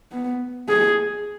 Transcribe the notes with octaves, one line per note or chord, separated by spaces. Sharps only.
B3
G#4